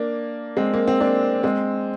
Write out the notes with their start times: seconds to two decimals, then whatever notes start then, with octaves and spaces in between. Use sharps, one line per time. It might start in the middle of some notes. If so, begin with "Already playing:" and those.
Already playing: A#3 D4
0.57 G#3 C4
0.74 A#3
0.88 C4
1.00 A#3 D4
1.43 G#3 C4